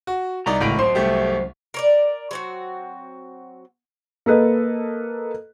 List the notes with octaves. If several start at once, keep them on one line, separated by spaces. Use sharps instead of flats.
F#4
C2 D#4 D5 A#5
G#1 A2 C#3 D7
F#2 C5 C6
C2 A3 G4
A#4 C#5 D5
F#3 C4 F#4
A#3 A4 B4 D#5